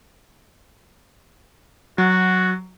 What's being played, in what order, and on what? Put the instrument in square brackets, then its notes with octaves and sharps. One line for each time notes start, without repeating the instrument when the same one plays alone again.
[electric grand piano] F#3 [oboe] F#4